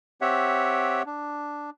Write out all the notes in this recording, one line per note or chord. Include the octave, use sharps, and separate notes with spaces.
C4 G4 C#5 E5 F#5
D4